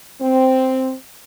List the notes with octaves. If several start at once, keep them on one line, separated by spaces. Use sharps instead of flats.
C4